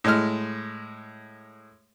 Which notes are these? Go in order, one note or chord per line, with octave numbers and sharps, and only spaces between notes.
A2 G#3 F6